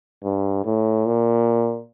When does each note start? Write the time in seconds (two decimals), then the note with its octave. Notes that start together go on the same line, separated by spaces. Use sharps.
0.24 G2
0.65 A2
1.06 A#2